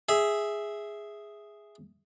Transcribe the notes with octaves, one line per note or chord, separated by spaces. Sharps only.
G#4 E5